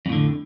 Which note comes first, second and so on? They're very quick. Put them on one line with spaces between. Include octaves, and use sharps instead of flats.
F2 A2 D3